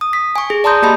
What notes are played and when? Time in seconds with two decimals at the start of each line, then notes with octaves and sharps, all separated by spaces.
0.01 D#6
0.13 B6
0.36 G#5 C#6
0.50 G#4
0.64 D5 A5 A#5 C6 D#6 G6
0.82 A#3 G4 D#5 A5 B5 C6